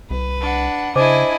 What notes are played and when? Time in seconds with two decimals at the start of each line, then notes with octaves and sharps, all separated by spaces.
0.11 C2 B4
0.41 D4 F#5
0.96 C#3 D4 E4 C5 D#5 G#5 D6